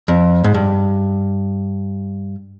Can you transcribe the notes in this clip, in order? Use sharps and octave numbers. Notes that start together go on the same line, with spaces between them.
F2
G#2
G2